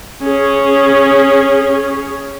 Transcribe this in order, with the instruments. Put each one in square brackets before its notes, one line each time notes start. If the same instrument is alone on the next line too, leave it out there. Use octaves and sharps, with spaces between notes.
[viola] C#4 G#4